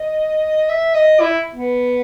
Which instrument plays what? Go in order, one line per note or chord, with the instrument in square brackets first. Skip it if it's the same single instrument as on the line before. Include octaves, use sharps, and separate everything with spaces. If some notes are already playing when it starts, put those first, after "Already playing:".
Already playing: [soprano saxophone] D#5
E5
D#5
E4
B3